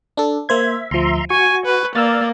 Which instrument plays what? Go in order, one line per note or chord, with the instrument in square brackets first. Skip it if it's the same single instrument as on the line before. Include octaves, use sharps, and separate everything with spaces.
[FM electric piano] D4 A4
[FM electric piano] A#3 C5 G#6 [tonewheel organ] E5
[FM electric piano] D2 F3 [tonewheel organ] E5 A#5 C6
[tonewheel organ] F#4 [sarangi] G#5 [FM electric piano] C#6
[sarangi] B4
[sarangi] A#3 [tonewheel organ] D5 [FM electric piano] E6 F6 A6